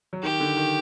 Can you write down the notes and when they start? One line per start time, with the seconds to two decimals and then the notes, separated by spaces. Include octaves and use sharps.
0.13 F#3
0.23 D#3 G4
0.40 D3
0.57 D#3